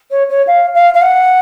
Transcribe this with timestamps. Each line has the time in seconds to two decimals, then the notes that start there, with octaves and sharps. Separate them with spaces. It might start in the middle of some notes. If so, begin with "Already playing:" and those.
0.10 C#5
0.29 C#5
0.47 F5
0.74 F5
0.94 F5
1.01 F#5